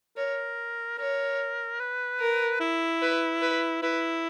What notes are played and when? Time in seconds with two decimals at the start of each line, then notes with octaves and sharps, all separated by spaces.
0.17 A#4 C#5
0.98 A#4 C#5
1.80 B4
2.20 A#4
2.61 E4
3.02 B4
3.41 B4
3.82 E4 B4